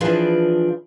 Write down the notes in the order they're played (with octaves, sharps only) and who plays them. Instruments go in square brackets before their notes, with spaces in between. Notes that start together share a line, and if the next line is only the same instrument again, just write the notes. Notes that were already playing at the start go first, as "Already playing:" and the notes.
[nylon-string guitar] E3 F3 D4 F4 G#4 B4